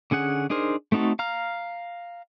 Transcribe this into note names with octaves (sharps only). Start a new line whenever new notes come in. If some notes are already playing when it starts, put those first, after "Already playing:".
D3 C#4 G#4 F#5
D4 D#4 G#4 A#4 C5
A3 C4 D#4 F#4 A4
F5 A#5 F6